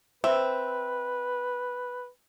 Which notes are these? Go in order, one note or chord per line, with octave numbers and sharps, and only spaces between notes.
C4 B4 E5